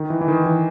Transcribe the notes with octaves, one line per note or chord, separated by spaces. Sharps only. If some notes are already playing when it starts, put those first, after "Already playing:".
Already playing: D#3
E3
E3
D#3
E3